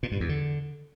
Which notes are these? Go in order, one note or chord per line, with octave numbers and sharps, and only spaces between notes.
A#2
G2
E2
D3